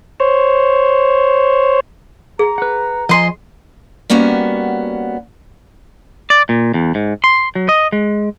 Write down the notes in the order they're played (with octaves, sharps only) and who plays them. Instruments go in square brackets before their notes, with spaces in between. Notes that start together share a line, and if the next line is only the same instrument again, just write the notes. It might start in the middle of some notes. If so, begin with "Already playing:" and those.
[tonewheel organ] C5 C#5
[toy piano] G#4 [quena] A#5
[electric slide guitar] B4 F#5
[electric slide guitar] F3 G#5 [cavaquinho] D#5 C6
[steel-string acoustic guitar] G3 A#3 B3 C#4 F#4
[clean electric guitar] D5
A#2
E2
G#2
C6
F#3
D#5
G#3